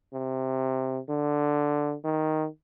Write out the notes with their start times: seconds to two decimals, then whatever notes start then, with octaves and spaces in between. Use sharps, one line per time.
0.14 C3
1.09 D3
2.05 D#3